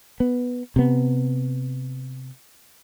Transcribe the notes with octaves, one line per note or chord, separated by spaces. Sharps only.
B3
C3 B3